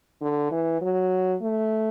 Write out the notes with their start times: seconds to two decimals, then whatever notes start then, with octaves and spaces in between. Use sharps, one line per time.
0.22 D3
0.51 E3
0.81 F#3
1.42 A3